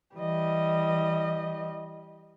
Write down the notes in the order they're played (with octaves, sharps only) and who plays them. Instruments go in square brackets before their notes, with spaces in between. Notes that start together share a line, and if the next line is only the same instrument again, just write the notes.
[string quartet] E3 G3 D#5